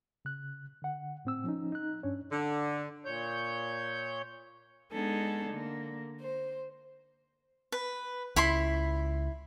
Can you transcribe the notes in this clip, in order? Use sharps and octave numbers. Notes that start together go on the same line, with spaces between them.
C#3 F#6
D3 F#5
A2 C4 E6
F3 C#4 D#4
D#4 F#6
G2 C#4 D4 C#5
D3
A#2 C#5 G6
G#3 B3 D4 D#4 G#4 A4
D3 A#3
C5
B4
C#2 E4 B5 C6